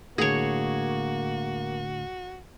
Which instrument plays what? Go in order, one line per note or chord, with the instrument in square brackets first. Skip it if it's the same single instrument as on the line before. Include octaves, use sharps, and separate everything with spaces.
[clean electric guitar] A2 D3 [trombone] A#3 [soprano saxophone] F#4 [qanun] G#4 C#5